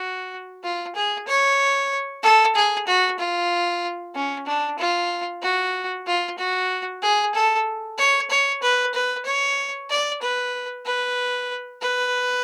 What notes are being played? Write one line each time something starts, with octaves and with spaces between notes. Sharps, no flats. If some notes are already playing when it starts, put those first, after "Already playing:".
Already playing: F#4
F4
G#4
C#5
A4
G#4
F#4
F4
C#4
D4
F4
F#4
F4
F#4
G#4
A4
C#5
C#5
B4
B4
C#5
D5
B4
B4
B4